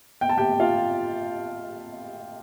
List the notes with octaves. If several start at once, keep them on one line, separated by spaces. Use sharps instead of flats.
G5
A5
G4 G5
F4 F5